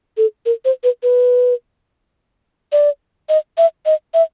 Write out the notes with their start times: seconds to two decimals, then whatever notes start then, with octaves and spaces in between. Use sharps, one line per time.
0.17 A4
0.46 A#4
0.65 C5
0.84 B4
1.03 B4
2.72 D5
3.29 D#5
3.57 E5
3.86 D#5
4.14 E5